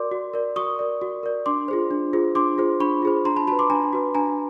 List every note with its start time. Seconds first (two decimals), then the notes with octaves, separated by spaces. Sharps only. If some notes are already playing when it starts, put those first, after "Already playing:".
Already playing: F#4 A#4 D5 C6 D6
0.12 F#4
0.34 A#4 D5
0.56 F#4 C#6 D#6
0.79 A#4 D5
1.02 F#4
1.23 A#4 D5
1.46 D4 C6 D6
1.68 F4 G#4 C5
1.91 D4
2.13 F4 G#4 C5
2.35 D4 C6 D6
2.58 F4 G#4 C5
2.80 D4 B5 C#6
3.02 F4 G#4 C5
3.25 D4 A#5 C6
3.36 A5 B5
3.47 F#4 A5 B5
3.52 B4
3.59 C6 D6
3.70 D4 G#5 A#5
3.93 F#4 B4
4.15 D4 G#5 A#5